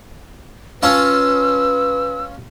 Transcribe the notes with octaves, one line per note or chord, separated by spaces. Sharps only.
C#4 F4 B4 A5 E6